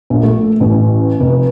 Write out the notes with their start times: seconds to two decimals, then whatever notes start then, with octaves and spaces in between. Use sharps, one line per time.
0.10 A#1
0.23 A3
0.60 A1
1.20 F1